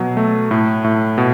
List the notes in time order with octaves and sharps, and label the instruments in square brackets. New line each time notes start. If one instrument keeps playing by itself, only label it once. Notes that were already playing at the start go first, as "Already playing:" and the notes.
Already playing: [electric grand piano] B2 F#3
A3
A2
A2
B2